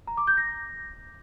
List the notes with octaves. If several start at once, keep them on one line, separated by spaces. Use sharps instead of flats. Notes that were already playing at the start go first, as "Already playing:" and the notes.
A#5
D6
G6
A#6